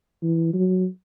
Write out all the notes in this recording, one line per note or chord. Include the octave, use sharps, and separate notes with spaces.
E3
F#3